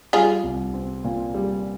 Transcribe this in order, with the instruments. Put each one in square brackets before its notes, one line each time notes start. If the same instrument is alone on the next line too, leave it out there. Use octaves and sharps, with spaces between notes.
[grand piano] G3 [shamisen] F4 G#4
[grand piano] C2
C4
A#2
G3